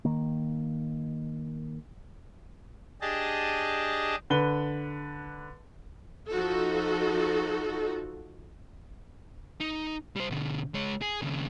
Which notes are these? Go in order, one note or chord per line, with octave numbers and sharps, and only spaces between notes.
D#3 A#3
D4 G4 G#4 D#5 A5
D3 B4 G7
F3 D#4 F#4 A4
D#4
G3 C5
B2 D3
G#3 C#5
G#4
D#2 C#3